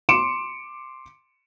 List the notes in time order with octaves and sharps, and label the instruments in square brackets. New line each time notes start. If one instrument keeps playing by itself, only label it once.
[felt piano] C6 D6 C#7 D7 E7